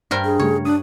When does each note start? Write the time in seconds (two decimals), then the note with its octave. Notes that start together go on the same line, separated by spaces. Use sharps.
0.11 G2 D4 A#4 C5 G5
0.25 G#4
0.39 C#3 G3 A3 C#5
0.65 D4 D#6 F#6